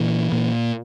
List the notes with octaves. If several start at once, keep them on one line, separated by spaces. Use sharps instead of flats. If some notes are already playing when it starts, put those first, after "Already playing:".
Already playing: A#2 E3
A#2